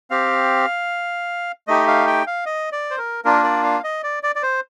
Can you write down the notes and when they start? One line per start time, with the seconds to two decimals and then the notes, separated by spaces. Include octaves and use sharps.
0.11 C4 G4 F5
1.68 A3 D#4 G4 D#5
1.88 F5
2.07 G5
2.27 F5
2.46 D#5
2.72 D5
2.90 C5
2.98 A#4
3.25 A#3 D4 F4 A#4
3.44 D5
3.64 F5
3.84 D#5
4.03 D5
4.23 D5
4.36 D5
4.43 C5